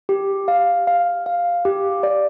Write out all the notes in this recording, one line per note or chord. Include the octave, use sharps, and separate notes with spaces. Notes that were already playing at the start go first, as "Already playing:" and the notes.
G4
F5
F5
F5
G4
D5